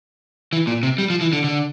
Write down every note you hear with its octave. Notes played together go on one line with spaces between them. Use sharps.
E3
A#2
C3
G3
F3
E3
D3
D3